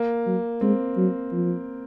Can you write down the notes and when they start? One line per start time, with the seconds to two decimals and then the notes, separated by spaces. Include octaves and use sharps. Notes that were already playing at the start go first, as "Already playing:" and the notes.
Already playing: A#3
0.26 F#3
0.61 G#3 C4
0.97 F#3
1.32 F3